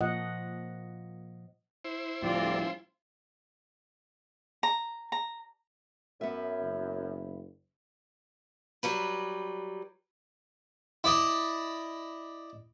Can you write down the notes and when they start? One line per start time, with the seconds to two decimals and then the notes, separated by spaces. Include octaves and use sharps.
0.01 A#2 F3 D#5 F#5
1.85 E4 C5
2.22 D2 A2 F3 G3 C4 F4 D5
4.63 A#5
5.12 A#5
6.21 F#2 B3 E5
6.60 F#1
8.83 F#3 G3 B4
11.04 E4 D5 D#5